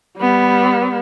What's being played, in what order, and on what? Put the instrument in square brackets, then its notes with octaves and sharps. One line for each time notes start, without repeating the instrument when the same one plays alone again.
[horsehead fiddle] G3 B3